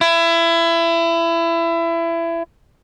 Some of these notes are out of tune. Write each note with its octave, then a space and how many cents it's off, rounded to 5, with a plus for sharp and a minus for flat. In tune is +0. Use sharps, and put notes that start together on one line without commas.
E4 +25